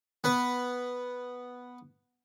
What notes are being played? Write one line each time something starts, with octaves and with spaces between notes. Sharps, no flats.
B3 B4